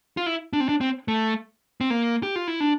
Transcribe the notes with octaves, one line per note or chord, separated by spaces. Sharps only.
F4
E4
D4
C4
D4
C4
A3
C4
A#3
G4
F4
E4
D4